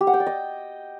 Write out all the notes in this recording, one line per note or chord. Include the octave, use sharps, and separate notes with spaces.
G4
F#5
G5
D5
D#5